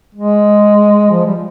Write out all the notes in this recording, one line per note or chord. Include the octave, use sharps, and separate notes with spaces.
G#3
F3
G3